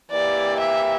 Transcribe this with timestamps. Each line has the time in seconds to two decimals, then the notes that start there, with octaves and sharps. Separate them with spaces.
0.11 E3 A#3 E4 G4 D5
0.60 E5